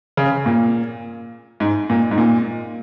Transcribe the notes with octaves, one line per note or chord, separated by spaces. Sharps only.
C#3
A#2
G#2
A#2
G#2
A#2